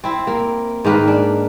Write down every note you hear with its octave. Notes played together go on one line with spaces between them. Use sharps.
C4 E4
A#3
G#2 D#3 A#3 B4
D4